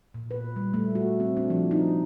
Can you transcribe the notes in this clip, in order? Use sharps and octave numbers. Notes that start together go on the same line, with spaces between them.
A#2
B4
G3
A3
F#4
C4
D4
F3
D#4